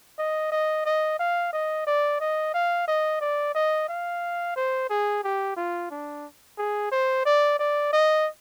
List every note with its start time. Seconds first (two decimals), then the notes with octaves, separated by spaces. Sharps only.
0.18 D#5
0.52 D#5
0.86 D#5
1.19 F5
1.53 D#5
1.87 D5
2.20 D#5
2.54 F5
2.88 D#5
3.21 D5
3.55 D#5
3.89 F5
4.56 C5
4.90 G#4
5.24 G4
5.57 F4
5.91 D4
6.58 G#4
6.92 C5
7.26 D5
7.59 D5
7.93 D#5